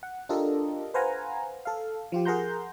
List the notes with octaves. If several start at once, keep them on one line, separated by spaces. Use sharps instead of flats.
F#5
D4 F4 G4 A4 A#4 D#5
B4 C5 F5 F#5 G#5 A#5
A4 F5
F3 F4 G4
G#4 A#4 F#5 A#5 C6 G6